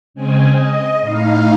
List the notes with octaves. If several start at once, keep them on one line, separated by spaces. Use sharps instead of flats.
C#3 G#3 C4 G#5
D#5
A2 D#4 F5